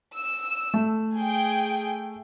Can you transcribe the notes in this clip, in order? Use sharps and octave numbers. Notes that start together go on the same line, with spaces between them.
E6
A3
G#4 G5